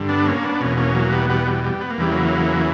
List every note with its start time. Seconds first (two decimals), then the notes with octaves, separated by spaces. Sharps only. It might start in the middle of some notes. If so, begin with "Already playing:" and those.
Already playing: G2 D3
0.09 B3 D4
0.26 A#3 C#4
0.43 B3 D4
0.60 E2 B2 A#3 C#4
0.77 A#3 C#4
0.94 F#3 A#3
1.12 G3 B3
1.29 G3 B3
1.47 G3
1.64 G3
1.81 B3
1.91 A#3
1.98 E2 C#3 E3 G3
2.12 F#3 A#3